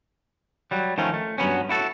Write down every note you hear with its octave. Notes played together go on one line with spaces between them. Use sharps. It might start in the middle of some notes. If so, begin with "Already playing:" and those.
F#3 G3
D#3 F3 A3 C#4
A3
G2 F#3 B3 C#4
E4 F#4 A4